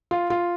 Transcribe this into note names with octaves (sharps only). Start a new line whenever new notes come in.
F4
F4